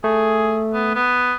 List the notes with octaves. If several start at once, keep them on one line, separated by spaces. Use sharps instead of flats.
A3 G#4
B3
B3